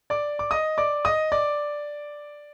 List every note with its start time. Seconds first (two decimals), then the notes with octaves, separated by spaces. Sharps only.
0.10 D5 D6
0.39 D6
0.51 D#5 D#6
0.78 D5 D6
1.05 D#5 D#6
1.32 D5 D6